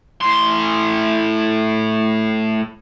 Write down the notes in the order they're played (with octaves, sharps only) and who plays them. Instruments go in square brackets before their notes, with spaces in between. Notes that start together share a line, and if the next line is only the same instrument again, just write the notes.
[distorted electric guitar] A2 C6